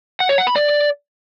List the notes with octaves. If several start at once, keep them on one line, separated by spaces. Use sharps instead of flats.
F#5
C#5
F#5
B5
D5